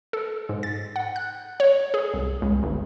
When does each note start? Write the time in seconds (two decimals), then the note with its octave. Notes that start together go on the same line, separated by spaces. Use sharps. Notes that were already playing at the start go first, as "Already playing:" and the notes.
0.13 A4
0.49 G#2
0.63 A6
0.96 F#5
1.16 F#6
1.60 C#5
1.94 G#4
2.14 C2
2.42 C#2
2.63 G1